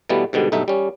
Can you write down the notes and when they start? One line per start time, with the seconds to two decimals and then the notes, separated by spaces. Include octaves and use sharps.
0.09 B2 E3 G3 A3 B3
0.33 G#2 B2 D3 G3
0.52 B1 G2 A3 D#4 E5
0.68 G3 C#4